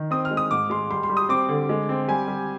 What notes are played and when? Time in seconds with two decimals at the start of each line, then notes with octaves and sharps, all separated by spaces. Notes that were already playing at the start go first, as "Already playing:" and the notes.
Already playing: D#3
0.11 C4 D#6
0.25 F6
0.31 G#3
0.37 D#6
0.51 G#2 D6
0.70 G#3 C6
0.90 G3 C6
1.03 C6
1.09 G3
1.17 D#6
1.29 C4 D6
1.49 D3
1.69 G#3
1.89 C4
2.08 G3 G#5
2.28 G3